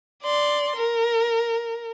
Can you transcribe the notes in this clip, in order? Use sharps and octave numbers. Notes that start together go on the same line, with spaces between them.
D5 C6
A#4